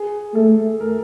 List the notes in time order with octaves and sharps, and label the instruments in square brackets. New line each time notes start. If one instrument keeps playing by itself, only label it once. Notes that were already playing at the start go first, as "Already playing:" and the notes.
Already playing: [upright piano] G#4
[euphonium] A3 [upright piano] A4
[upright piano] A#4